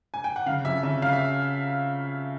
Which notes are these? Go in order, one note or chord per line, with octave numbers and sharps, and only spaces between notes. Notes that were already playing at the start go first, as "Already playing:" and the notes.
G#5
G5
F#5
C#3 F5
F2 E5
C#3 E5
C#3 F5
E5